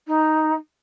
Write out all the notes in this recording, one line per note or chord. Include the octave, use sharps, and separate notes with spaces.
D#4